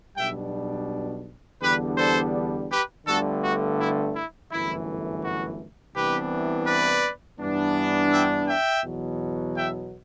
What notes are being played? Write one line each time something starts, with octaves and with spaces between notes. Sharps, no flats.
B1 B2 G3 D4 E5 G5
E2 D3 G3 B3 D4 G4 B4
A4 C5
G4 B4
G1 G2 D3 A3 F#4 A4
F#4
E4
E4
G1 F#2 E3 A3 E4
F#4
C2 C3 E3 B3 D4 G4 B4
B4 D5
G2 E3 B3 D4
E5 G5
E5 G5
E2 B2 F#3
E5 G5